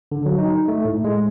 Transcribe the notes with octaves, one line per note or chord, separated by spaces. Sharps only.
D3
F#3
D#4
A3
A2
G#3